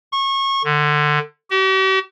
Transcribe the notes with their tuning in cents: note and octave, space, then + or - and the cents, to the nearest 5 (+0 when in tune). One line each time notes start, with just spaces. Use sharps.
C#6 -25
D3 +20
G4 -45